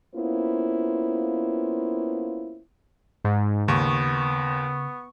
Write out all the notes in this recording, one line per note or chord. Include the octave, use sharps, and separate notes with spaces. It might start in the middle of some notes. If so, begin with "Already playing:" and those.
A#3 B3 C#4 E4 F4 C5
G#2
D#2 C#3 B3 C#6